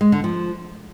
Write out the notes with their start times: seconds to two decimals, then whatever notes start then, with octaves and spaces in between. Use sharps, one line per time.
0.01 G#3
0.12 D3
0.24 F3